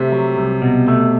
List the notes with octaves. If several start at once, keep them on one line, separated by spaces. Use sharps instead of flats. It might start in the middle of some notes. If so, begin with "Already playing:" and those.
Already playing: C3 A3
F#3
C2
B2
A3